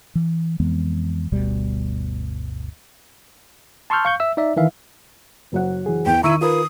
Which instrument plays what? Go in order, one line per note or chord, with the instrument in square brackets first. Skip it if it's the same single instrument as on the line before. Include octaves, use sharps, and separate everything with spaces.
[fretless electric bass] E3
F2 E3 G#3 B3
G1 D2 B2 G3
[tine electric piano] A5 C6 C#6 E6 F6 G6
F5 C#6 G6
E5 E6
D#4 D5 E5
D#3 E3 E5 F5
[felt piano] F#1 F#3 F#5
[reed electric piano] E3 G#4
[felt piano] E2 [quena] G5
[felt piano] D#3 D#7 [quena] E4 [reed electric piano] A#5 C#6 E6
[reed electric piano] F4 A#4 B4 [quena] D#6